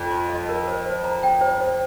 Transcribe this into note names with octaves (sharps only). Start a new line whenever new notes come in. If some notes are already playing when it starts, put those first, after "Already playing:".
Already playing: F2
C6
D#5
A#4
C5
C5
A#5
G5
C5
C5